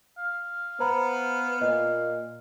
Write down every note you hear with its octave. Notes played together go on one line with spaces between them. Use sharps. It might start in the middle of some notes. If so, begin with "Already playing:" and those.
F5
B3 C5 A#5 B5
A#2 D#5